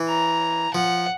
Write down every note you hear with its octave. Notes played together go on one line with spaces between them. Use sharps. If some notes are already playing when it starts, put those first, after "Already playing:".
Already playing: E3
A#5
F3 F#5